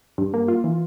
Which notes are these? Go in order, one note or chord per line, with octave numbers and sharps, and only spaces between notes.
G2
A#3
F4
E3